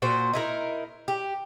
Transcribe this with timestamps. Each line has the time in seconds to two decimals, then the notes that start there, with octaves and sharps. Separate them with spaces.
0.02 A#2 A#3 F#4 C5
0.33 D#4 E4 A#4
1.08 G4